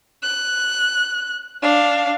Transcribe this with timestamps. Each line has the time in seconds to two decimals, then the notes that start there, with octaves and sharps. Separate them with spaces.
0.23 F#6
1.62 D4 F5